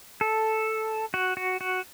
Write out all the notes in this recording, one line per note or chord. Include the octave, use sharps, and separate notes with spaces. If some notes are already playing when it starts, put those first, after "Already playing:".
A4
F#4
F#4
F#4